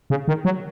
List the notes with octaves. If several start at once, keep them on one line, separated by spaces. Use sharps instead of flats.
C#3
D#3
F#3